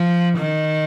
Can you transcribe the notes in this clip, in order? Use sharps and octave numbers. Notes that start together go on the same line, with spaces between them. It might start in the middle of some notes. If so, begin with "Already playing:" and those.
Already playing: F3
D#3